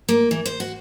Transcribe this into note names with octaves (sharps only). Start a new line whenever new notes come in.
A#3
E3
C5
F#4